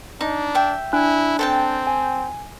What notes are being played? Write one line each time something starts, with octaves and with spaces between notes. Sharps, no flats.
D4 D#4
E5 G5
D4 E4 G#5 F#6
C4 A4 G5 A5
G#5